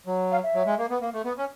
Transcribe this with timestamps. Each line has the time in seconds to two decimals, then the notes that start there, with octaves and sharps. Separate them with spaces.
0.07 F#3
0.31 F5
0.43 E5
0.55 F#3
0.66 G#3
0.78 A#3
0.90 B3
1.01 A#3
1.14 A3
1.25 B3
1.38 C#4